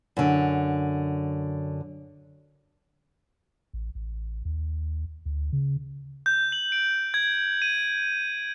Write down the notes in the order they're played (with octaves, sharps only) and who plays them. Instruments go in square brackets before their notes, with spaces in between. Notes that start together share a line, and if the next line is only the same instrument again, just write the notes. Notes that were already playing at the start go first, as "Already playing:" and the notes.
[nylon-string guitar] F#2 D3
[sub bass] A1
A1
D#2
D2
C#3
[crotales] G6
F#7
D7
G#6
D#7